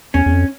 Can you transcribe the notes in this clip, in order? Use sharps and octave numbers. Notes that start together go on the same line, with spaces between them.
E2 C#4
E2
F2